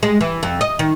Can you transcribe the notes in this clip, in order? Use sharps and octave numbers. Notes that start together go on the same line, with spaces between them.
G#3
E3
F2
D#5
D#3